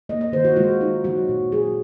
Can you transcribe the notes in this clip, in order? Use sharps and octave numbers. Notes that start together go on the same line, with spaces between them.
A#3 D#5
D#5
D#3 C5
F#4
G#3 F4
D#4
F#3 F#4
A#2
F#3 G#4